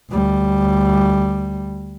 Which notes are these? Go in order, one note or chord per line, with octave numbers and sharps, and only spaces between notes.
D2 G3